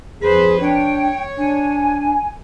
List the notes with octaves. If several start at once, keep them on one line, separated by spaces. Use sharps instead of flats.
F2 G#4 B4 C5
D4 C#5 G5
D4 G#5